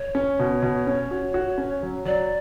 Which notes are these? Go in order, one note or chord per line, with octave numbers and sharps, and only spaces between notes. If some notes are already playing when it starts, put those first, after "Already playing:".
Already playing: C#5
C#4
B2
B2
C#4
F#4
F#4
C#4
F#3
F#3 D5